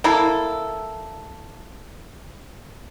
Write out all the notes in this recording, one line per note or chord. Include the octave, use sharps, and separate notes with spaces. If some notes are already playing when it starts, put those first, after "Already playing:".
A#3 E4 A4